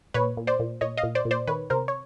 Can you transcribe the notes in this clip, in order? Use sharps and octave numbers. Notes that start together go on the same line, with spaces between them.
A#2 B4 C#5
A#2
C5 D5
A#2
A#2 C#5 D#5
D#5 F5
A#2
C5 D5
A#2
C5 D5
D#3 B4 C#5
C3 A#4 C5
C#5